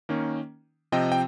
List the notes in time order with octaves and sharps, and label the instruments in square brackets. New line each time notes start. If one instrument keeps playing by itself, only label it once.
[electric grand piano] D#3 A#3 C#4
C3 F3 C4 D#5 G5
G5